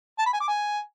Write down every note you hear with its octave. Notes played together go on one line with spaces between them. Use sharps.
A5
B5
G#5
D6
G#5